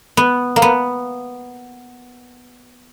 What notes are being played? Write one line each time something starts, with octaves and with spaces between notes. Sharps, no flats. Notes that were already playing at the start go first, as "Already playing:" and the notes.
B3
A#3
B3